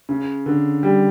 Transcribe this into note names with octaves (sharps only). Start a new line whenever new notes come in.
C#3
D3
G3